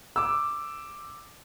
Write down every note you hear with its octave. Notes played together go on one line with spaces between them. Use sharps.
D6 E6